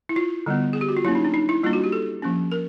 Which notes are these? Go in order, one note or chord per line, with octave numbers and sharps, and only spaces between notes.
E4
F4
D3 G3 B3
G#4
G4
F#4
F4
F#3 A#3 C#4 E4
D#4
D4
D#4
E4
G3 A#3 D4 F4
F#4
G4
A4
F3 A#3 C#4
A#4